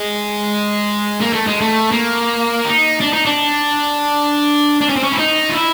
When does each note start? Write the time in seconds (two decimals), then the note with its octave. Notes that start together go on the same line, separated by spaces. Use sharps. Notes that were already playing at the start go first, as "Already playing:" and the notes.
Already playing: G#3
1.20 A#3
1.33 A3
1.47 G#3
1.61 A3
1.92 A#3
2.65 D#4
3.01 D4
3.13 D#4
3.26 D4
4.81 D4
4.89 C#4
4.96 C4
5.03 C#4
5.12 E4
5.18 D#4
5.49 F4
5.54 E4